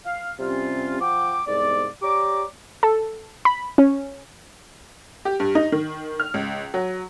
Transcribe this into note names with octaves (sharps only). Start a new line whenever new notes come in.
F5
C3 G3 C4 C#4 F4
F3 F#5 G5 D6
C2 G#2 B3 D5
G4 C#5 D5 A#5 D6
A4
B5
C#4
G4
G2
D#4
D#3
F6
C#2
F#3